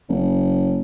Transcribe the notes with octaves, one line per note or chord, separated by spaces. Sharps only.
F#1